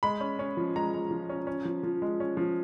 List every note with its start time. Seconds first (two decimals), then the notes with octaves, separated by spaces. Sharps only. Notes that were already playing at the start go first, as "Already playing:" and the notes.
0.03 G#3 B5
0.21 C#4
0.39 C#4
0.57 F3
0.76 G#3 A#5
0.94 G#3
1.11 F3
1.29 C#4
1.47 C#4
1.65 F3
1.83 F3
2.02 G#3
2.20 C#4
2.37 F3